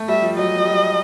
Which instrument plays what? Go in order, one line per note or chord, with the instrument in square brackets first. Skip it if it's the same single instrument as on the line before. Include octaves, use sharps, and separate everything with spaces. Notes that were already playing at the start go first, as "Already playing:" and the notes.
Already playing: [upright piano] A3
[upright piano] G3 [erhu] E5
[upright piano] F3
[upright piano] F#3 [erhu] D#5
[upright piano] F#3
G3